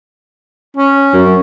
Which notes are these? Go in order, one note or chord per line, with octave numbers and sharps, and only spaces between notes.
C#4
F#2